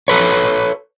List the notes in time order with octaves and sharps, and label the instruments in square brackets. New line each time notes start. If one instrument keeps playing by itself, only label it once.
[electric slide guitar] A4 B4 C#5